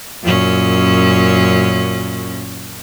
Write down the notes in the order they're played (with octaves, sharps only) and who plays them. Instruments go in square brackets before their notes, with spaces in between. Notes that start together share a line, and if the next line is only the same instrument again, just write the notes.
[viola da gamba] F#2 A#2 C#4